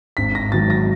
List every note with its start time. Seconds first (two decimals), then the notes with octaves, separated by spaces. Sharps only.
0.17 G#1 B6
0.35 A#6
0.52 G#2 D#3 F#3 A6
0.70 A#6